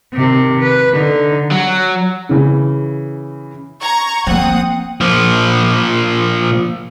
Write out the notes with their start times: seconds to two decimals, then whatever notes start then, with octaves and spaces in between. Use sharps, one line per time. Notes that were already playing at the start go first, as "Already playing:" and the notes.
0.14 C3 D#3
0.60 B4
0.92 D3 D#4
1.51 F#3
2.29 C#3 E3
3.81 A#5 C#6 G#6
4.27 F3 A#3 C4 F#5 D#6
5.01 A#2 F3